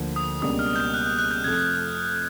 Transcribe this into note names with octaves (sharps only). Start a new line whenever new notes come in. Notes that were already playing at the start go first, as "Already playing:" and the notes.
Already playing: D2 D3 F3 A#3
D#6
C#2 B2 G3 A#3 D4 D#6
F6
G6
F#6
F#6
F#6
G6
F2 C3 F3 A3 G#6